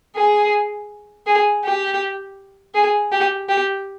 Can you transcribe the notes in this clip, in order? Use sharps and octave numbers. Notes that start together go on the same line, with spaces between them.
G#4
G#4
G4
G#4
G4
G4